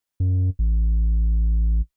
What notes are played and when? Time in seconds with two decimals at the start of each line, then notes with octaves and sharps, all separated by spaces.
0.20 F#2
0.59 A1